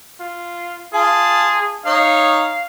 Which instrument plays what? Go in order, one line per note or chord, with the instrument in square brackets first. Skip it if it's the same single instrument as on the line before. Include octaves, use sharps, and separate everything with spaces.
[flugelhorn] F4
[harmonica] F4 A5 [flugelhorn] G#4
[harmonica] D#4 C#5 [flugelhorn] F5